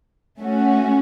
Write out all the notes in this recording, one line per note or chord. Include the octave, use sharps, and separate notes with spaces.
A3 C#4 F#4